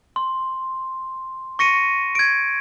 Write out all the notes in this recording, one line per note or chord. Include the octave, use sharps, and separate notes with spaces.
C6
C#6 A#6 C#7 D#7
G#6 D7